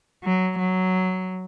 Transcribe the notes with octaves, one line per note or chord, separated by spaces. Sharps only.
F#3
F#3